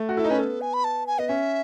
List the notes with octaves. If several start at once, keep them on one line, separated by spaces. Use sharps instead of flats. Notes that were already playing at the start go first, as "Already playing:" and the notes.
Already playing: A3
F#4
E4 A4
D#4
C#4 B4
B3 A4
G#5
B5
A5
G#5
B3 D#5
C#4 E5